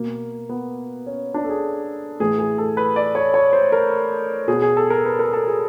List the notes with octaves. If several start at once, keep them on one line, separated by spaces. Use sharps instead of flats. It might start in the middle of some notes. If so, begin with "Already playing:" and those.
Already playing: B2 A#3
B3
C#4
D4
A4
G#4
A2 E3 G#4
G#4
A4
B4
D5
C#5
C#5
C5
A#4
B2 G#4
G#4
A4
A#4
B4
A#4
A4
G#4